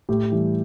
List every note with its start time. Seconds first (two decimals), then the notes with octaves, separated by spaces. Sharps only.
0.09 A2 G4
0.32 E3 G3